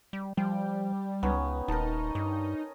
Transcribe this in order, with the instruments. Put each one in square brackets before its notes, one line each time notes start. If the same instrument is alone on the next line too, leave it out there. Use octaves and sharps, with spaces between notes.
[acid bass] G3
[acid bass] F3 [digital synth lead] G3 [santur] G5
[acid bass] C#2 [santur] B3 C#4 D#4
[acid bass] D#1 [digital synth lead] D#4 [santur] A#4 A5
[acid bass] G2 [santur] D#5